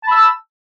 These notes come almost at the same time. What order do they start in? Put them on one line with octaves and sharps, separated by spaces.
A5 B5 E6